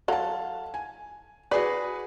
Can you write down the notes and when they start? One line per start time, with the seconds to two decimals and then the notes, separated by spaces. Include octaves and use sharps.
0.08 F#3 A4 F5 A5
0.74 G#5
1.51 F#4 G#4 B4 D5